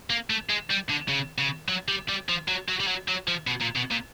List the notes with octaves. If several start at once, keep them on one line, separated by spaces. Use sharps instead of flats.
A#3
A3
G#3
G3
D3
C#3
C#3
F#3
G3
G3
F3
F#3
F#3
G3
F#3
F#3
F3
B2
A#2
B2
A#2